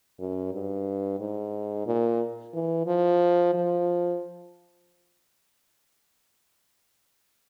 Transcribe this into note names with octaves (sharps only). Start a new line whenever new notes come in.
F#2
G2
G#2
A#2
E3
F3
F3